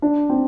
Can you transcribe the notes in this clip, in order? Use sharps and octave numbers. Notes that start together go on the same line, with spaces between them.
D4
C4